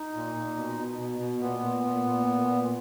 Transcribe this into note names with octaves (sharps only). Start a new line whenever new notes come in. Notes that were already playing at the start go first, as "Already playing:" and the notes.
Already playing: D#4
A#2
A#2
B2
B2
B2
B2
A#2 B3
A#2
A#2
A#2
A#2
A#2